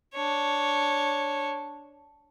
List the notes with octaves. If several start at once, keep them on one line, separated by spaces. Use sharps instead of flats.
D4 C#5